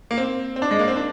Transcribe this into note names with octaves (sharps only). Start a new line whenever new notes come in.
A#3
C4
C4
D4
G#3
A#3
C4
D4